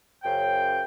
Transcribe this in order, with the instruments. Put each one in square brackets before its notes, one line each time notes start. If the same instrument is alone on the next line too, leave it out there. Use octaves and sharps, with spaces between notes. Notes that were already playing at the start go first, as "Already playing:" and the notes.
[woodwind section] F#2 C#3 C5 G5